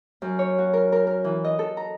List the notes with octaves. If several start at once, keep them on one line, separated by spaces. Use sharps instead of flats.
F#2
C#5
F#4
A#4
A#4
A#4
E3
D#5
A4
A#5